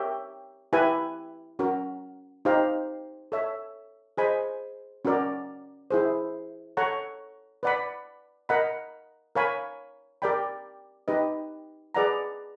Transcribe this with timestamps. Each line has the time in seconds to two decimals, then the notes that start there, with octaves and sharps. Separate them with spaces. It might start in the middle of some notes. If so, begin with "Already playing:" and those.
Already playing: G4 A#4 C#5 E5 G5
0.73 E4 G4 B4 E5 G#5
1.59 C#4 F#4 A#4
2.45 D#4 G4 C5 F5 A#5
3.32 A4 C#5 E5
4.17 G#4 C5 D#5 G#5 B5
5.05 C#4 F#4 A#4 D5
5.91 E4 G#4 C5
6.77 A4 C#5 F#5 A#5 C#6
7.63 B4 D5 F#5 B5
8.49 A#4 D#5 F#5 B5
9.35 A#4 C#5 F5 G#5 B5
10.22 G4 A#4 D5 G5 B5
11.08 D#4 G4 B4 D#5
11.94 G#4 B4 D5 F#5 A#5